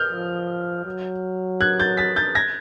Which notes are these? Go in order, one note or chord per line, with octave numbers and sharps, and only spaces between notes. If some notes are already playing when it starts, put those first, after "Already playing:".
Already playing: F6 G6
F3
F#3
F#6 G#6
G6 A6
A6 B6
G6 A6
G#6 A#6